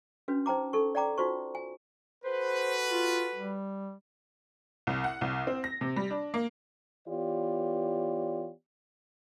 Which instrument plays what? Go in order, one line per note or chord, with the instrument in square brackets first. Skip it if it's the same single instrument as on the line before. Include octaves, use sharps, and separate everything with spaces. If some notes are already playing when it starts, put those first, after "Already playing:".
[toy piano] C#4 D4 F#4 B4
D#4 C5 G5 A#5 D6
D#4 A4 C#6
D5 F#5 G5 A#5 D6
D#4 F4 F#4 C5 C#6
G#5
[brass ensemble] F#4 A4 B4 [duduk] C5
[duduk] F4
G3
[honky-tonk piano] C2
F#5
C2
C4
A#6
C3
G3
D4
A#3
[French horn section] E3 B3 F4 G4 C#5 D5